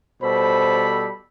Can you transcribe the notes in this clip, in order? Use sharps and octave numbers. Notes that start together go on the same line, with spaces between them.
B2 G3 A4 C5 B5